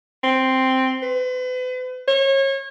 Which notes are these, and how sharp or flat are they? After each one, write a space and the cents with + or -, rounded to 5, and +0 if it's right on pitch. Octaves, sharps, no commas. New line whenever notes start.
C4 +0
B4 +40
C#5 -30